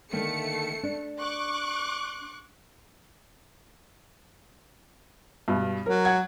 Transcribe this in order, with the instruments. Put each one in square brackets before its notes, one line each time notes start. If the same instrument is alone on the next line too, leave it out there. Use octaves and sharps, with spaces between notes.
[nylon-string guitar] D3 D#3 A#3 [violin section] A3 C#7
[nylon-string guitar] D4
[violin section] C#6 D6 F#6
[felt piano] G2 B2
[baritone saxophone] F#3 [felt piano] A#4
[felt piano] F#5 G#6